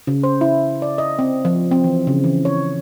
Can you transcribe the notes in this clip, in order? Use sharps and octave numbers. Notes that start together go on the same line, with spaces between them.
C#3
C5
E4
D5
D#5
C4
F3
C4
E3
C#3
E3
C#5